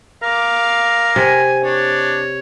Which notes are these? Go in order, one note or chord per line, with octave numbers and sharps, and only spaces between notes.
A#4 F5 D6
C3 G#5
D4 C#5